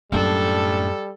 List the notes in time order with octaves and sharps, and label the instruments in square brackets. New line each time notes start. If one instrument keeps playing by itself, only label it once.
[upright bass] F#2 A#3 [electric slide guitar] A2 D4 [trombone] G3 [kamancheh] A4